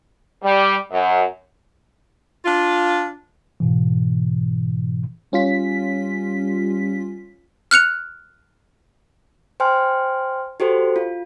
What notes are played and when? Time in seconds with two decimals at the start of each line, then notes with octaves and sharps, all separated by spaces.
0.43 G3
0.92 F#2
2.45 D4 F4
3.60 G#2 B2 E3
5.33 G3 C#4 F4 B6
7.71 F6 F#6 C#7 F7
9.60 C5 G5 G#5 C6 F6
10.60 F#4 G4 A4 C5
10.96 F4